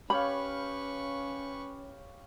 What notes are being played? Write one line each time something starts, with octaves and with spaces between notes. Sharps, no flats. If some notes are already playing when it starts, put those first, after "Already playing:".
C#4 G4 B4 C#5 F5 B5 C#6